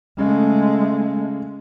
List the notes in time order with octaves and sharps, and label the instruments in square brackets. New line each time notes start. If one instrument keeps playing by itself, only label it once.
[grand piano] C#3 [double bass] G#3 A3